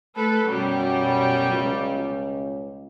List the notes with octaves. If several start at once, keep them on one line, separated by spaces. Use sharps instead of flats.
A3 A4 B4
F#2 B2 F#3 G3
C#2